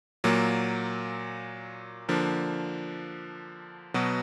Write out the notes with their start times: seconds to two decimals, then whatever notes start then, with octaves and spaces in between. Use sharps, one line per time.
0.24 A#2 F#3 A#3
2.09 D3 F3 A#3 D4
3.94 B2 F#3 B3